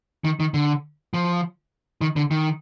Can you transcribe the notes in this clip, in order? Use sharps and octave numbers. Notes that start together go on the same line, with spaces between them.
D#3
D#3
D3
F3
D#3
D3
D#3